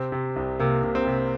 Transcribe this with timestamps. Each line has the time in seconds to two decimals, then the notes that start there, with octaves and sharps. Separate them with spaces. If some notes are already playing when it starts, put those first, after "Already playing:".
Already playing: C3 C4
0.12 C3
0.36 C2
0.60 C3 A#3
0.84 C3
0.95 C4
1.07 C3